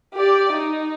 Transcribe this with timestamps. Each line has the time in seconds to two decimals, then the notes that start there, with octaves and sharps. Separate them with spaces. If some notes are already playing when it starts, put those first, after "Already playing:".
0.14 G4 D5
0.52 D#4